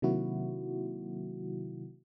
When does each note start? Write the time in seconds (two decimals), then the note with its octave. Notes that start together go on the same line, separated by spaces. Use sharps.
0.02 C3 D#3 F#3 A#3 E4 F#4